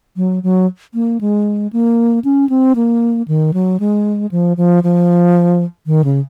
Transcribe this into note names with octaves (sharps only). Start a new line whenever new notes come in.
F#3
F#3
A#3
G#3
A#3
C#4
C4
A#3
D#3
F#3
G#3
F3
F3
F3
D#3
C#3